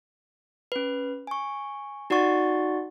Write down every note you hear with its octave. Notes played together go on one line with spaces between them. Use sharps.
C#4 B4
G#5 C#6
D#4 F#4 D5 F#5 C#6 A6